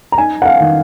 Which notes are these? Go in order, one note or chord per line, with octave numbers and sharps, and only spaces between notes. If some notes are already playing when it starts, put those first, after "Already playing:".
A#5
D#4 G#5
F#5
F5
D#3